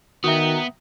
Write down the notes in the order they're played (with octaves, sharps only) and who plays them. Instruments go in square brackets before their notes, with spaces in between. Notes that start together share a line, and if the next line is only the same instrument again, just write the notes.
[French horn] D#3 [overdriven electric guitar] B3 [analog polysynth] F#4 G5 A#5 [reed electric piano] E5 D#6